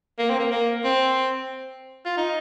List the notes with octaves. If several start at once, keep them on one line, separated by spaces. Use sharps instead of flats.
A#3
C4
A#3
A#3
C4
F4
D#4